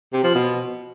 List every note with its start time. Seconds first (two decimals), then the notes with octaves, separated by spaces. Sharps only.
0.13 C3
0.24 F3
0.35 B2